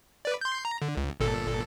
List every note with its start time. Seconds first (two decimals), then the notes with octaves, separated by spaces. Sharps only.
0.25 B4 D5
0.41 C6 G6
0.65 A#5
0.82 D3
0.97 C#2
1.20 G1 A#2 A4